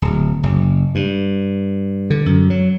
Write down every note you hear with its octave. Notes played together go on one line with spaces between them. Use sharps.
D1
F#1
G2
D3
F#2
F#3